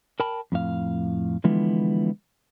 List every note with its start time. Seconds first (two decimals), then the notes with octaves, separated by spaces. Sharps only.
0.20 A#4 G5 A5 B5
0.52 F2 A2 F5
1.44 D3 E3 F3 G#3 B3 E4